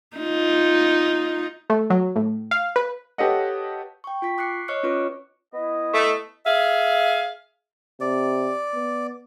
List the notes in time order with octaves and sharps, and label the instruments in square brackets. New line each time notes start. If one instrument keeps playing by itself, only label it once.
[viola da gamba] D#4 F4
[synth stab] A3
F#3
A2
F5
B4
[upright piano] G4 A4 B4 C#5 D#5 F#5
[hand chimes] G5 C#6
F4 C#6 B6
D6 F#6 C7 C#7
C#5 D#5 C#6 F6 F#6 C#7
C#4 F4 B4 C#6 D6
[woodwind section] B3 E4 D#5
[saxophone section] A3
G#4 E5 F5
[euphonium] C3 [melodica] D5
[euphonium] B3